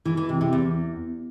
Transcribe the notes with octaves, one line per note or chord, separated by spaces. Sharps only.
E3
E3
C3
C3
E2